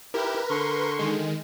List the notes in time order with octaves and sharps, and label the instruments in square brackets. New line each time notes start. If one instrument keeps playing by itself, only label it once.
[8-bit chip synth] E4 G4 [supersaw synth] A#4 B4
[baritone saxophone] D3 [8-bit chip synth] C6 C#6
[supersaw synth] D#3 G#3